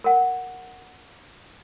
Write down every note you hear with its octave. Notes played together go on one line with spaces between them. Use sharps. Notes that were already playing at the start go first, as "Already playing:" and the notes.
A#4 F#5